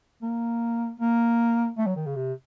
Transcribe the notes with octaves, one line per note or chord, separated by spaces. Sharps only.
A#3
A#3
A3
F#3
D#3
C#3
C3